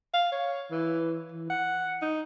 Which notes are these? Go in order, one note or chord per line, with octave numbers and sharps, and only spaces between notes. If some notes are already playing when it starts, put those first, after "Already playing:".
F5
C#5
E3
E3
F#5
D#4